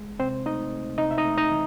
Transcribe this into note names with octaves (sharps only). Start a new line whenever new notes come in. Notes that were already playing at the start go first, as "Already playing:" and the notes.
Already playing: G#3
C3 C4 C5
A3 D#4 D#5
A3
C3 D#4 D#5
E5
D#4 D#5
A3
D#4 D#5
E3